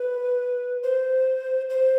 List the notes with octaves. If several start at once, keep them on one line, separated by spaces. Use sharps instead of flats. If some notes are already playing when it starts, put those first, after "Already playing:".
Already playing: B4
C5
C5